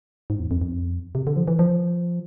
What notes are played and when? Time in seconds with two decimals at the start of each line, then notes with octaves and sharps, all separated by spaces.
0.30 G#2
0.40 E2
0.51 F2
0.62 F2
1.15 C3
1.27 D3
1.36 F3
1.48 E3
1.59 F3